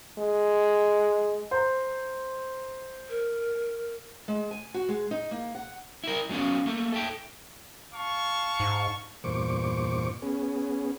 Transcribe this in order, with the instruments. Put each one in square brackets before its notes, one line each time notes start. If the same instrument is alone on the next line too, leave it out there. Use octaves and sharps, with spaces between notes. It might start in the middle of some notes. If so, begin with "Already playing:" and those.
[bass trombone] G#3
[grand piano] C5 A#5
[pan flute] A#4
[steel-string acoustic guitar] G#3
G#5
F#4
G#3
D#4
A#3
F#5
[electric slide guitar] E4 A#4
F#3 G#3 B3 C#4 F5
A3 A#3
A4 E5 G5
[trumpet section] F5 A5 C#6
[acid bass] G#2
[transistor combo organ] E2 G2 A#2 C5 C#6 D6
B3 C#4 G#4